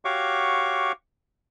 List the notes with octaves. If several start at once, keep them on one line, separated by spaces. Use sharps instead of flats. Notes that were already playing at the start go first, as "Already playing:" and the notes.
F#4 G4 C#5 F5 C#6 D6